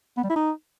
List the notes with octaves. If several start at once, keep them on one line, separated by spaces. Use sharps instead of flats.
B3
G3
E4
D#4